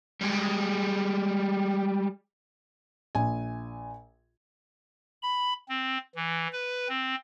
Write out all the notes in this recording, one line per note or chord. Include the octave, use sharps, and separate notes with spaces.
G3 G#3
A#1 G#5
B5
C4
E3
B4
C4